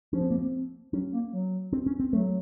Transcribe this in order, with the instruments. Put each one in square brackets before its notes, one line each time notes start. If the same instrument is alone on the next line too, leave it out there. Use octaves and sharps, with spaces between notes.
[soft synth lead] F3 [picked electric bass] C#4
[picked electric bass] C4
A#3
C4
[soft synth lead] F#3 [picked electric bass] C#4
[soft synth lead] A#3
F#3
[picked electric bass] C4
C#4
C4
[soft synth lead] F#3 [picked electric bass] A3